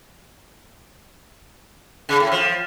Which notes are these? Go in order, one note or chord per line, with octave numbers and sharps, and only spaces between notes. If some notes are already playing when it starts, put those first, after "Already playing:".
C#3
A2
F3